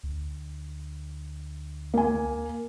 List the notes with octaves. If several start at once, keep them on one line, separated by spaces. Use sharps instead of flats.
D2
A#3 G#5